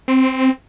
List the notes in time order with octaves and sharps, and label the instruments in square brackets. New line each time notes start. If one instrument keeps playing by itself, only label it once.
[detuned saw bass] C4